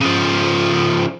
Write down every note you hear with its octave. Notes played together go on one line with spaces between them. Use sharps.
C#3 F3